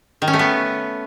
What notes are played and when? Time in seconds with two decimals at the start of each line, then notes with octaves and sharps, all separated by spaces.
0.22 D#3
0.28 C#4
0.33 A3
0.39 B3